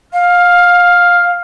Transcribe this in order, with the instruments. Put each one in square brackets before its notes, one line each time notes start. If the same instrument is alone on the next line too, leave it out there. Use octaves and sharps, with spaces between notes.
[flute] F5 [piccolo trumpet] F6